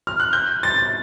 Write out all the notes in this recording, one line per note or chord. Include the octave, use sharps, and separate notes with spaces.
F6
F#6
G6
A6